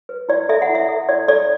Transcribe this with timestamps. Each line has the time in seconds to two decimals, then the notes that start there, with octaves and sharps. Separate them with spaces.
0.09 B4
0.29 E4 D5
0.49 A4 E5
0.62 F#5
0.69 E4
0.75 E5
0.89 A4
1.09 E4 D5
1.28 A4 D5